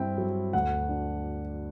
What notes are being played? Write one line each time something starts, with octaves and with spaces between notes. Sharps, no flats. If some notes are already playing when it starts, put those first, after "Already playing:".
Already playing: G2 C4 E4 G5
F#3
D2 F#5
D4